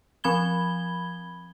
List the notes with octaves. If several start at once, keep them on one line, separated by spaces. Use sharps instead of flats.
F3 C4 B5 G#6 G7